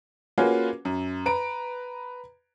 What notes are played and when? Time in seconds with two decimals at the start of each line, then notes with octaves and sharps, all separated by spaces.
0.38 A#3 C#4 F4 F#4 G#4 B4
0.85 F#2
1.26 B4 A#5 D7